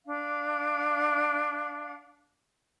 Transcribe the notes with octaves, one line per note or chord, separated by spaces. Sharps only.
D4 F5